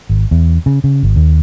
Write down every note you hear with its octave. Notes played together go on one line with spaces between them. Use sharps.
G#1
E2
C#3
C#3
G#1
D#2